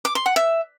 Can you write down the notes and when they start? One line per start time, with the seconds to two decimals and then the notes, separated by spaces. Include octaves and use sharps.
0.05 D6
0.15 C6
0.26 F#5
0.36 E5